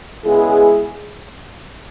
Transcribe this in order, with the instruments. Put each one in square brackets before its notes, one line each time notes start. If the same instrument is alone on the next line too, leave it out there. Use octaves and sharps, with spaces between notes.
[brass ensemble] C#3 G#3 B3 E4 G#4